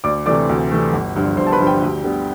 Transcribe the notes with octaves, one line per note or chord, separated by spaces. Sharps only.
D2 D5 D6
C3 E3 A3 D5 D6
D2
C3 E3 A3
G1
G2 D3 F3
G1 C5 C6
A5
B4 B5
G2 D3 F3
G4 G5
D2
D3 G3 B3